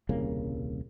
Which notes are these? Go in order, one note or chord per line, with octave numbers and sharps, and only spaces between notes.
D#1 C2 C#3 A#3